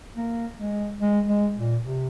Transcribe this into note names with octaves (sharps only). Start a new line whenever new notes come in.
A#3
G#3
G#3
G#3
A#2
C3